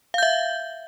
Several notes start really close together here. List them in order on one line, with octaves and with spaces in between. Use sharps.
F5 G6 E5